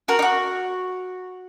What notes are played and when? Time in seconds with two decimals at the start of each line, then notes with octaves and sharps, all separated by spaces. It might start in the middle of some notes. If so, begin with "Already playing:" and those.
0.08 F#4 A#4
0.19 D#4
0.22 F#4